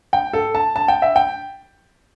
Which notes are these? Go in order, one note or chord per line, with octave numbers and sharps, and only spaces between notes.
G5
A4
A5
A5
G5
E5
G5